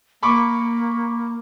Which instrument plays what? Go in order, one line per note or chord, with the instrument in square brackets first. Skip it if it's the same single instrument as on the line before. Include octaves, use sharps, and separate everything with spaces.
[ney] A#3 [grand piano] B5 C#6 D6